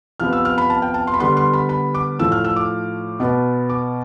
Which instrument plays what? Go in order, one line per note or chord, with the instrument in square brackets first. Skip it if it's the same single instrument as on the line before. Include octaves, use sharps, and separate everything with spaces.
[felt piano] C3 F3 B3 F6
E6
F6
B5
A5
G5
A5
C6
B5
D3 G3 B3 C6
C6
B5
B5
D6
A2 F3 A3 E6
F6
E6
D6
B2 B3
D6